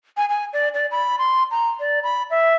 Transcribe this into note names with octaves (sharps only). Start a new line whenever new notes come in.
G#5
G#5
D5
D5
B5
C6
A#5
D5
B5
E5